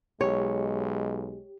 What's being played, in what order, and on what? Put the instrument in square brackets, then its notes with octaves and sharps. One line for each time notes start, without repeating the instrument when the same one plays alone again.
[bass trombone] B1 [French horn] G#3 [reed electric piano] G4 [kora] C#5